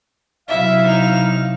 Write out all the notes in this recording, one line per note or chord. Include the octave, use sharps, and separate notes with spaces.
C3 F#3 E4 E5 F5
D#4 F7